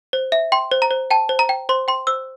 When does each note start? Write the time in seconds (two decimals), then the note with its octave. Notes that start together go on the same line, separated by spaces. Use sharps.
0.13 C5
0.32 E5
0.52 G5 C6
0.72 C5
0.82 A#5
0.91 C5
1.11 G5 A5
1.29 C5
1.39 A#5
1.49 G5
1.69 C5 C6
1.88 G5 C6
2.07 C5 E6